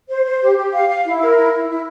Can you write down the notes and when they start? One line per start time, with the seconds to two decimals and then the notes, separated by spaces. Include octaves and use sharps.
0.10 C5
0.25 C5
0.42 G4
0.58 G4
0.73 F5
0.89 F5
1.05 E4
1.21 A#4
1.37 E4
1.52 E4
1.69 E4